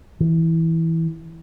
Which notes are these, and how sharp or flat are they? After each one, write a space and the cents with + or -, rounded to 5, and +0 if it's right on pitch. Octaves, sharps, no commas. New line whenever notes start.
E3 -10